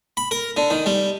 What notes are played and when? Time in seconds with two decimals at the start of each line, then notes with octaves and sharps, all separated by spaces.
0.17 B5
0.31 A#4
0.57 D3
0.70 D#3
0.86 G3